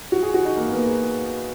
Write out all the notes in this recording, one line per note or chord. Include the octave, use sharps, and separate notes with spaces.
F#4
G#4
F#4
D#4
A#3
A#3
B3
G#4